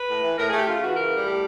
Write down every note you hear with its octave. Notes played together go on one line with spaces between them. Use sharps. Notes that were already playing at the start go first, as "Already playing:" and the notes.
Already playing: B4
A2
E3
A2 A#4
G#4
A3 G4
C#3 F4
E3 F#4
C#3 A#4
G3
A2 G4